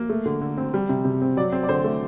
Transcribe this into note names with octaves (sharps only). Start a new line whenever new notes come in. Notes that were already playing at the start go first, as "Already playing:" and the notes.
Already playing: A#3
A3
D3
D3
C4
G3
C3
C3
C4
F#3 D5
C4
D5
D3 C5
A3